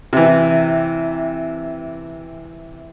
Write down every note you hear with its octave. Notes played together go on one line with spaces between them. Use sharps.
C3 E3